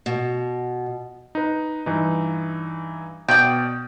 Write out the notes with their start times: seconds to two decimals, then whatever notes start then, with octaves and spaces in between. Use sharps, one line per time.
0.06 B2
1.35 D#4 B4
1.86 G2 E3 D#4
3.28 B2 D5 G5 D#6